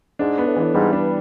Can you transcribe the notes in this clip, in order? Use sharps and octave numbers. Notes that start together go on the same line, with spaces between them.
G#2 D4
B3
A2
G#2 E3
A2
G#2 G3
G2 D4